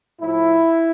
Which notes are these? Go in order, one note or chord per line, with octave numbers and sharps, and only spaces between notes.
A2 F3 E4